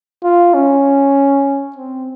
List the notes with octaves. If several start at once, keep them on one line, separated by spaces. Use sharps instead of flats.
F4
C#4
C4